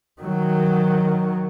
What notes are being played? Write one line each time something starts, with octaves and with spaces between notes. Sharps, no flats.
D#3 F#3